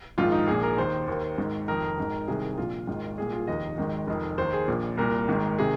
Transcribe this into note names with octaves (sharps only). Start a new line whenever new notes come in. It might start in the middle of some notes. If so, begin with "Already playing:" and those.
A#1 G#2 D#3 F4
D#4
A#1 A#2 G#4
A#4
D#2 D#3 C5
D#2 D#3
G#1 G#2 D#3
F1 F2 D#3 A#4
G#1 G#2 D#3
C2 C3 D#3 G#4
A#1 A#2 F4
G#1 G#2 D#3
C2 A#2 G#4
F4
F1 D#2 D#3 D#5
G#1 G#2 D#3
F1 F2 D#3
D#2 D#3 C5
G#4
A#1 A#2
C2 A#2 A#4
G#1 G#2 D#3
C3 D#3 G#4